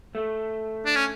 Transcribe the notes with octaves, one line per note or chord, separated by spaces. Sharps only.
A3
D4
C#4